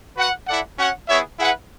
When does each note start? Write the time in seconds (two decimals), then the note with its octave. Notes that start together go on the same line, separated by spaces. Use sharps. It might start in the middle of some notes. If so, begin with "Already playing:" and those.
0.17 F#4 B4 F#5
0.48 E4 A4 D5 F#5
0.77 C#4 F#4 C#5 F#5
1.08 B3 E4 G#4 C#5 E5
1.38 E4 G#4 B4 F#5